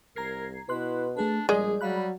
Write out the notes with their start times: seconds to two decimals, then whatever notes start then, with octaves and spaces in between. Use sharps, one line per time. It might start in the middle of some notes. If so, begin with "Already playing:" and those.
0.16 C2 A#4 A#5 G#6 C7
0.69 B2 E4 B4 C6 F#6
1.17 A3 D4 G#4 B4
1.49 A#1 G3 G#3 G#4 D5
1.81 F#3 G3 F5 B5 F#6